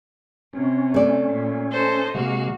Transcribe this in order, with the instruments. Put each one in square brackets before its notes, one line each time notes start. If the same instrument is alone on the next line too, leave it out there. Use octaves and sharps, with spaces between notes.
[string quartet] C3 [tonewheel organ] C#4
[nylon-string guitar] A3 D5
[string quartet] A#2
A4 C5 D#5
[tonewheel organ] C3 G#3 F5 [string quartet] A#3 F#4